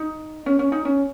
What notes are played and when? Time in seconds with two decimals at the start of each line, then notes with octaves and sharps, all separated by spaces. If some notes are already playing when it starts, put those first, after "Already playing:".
Already playing: D#4
0.46 C#4
0.59 C#4
0.72 D#4
0.85 C#4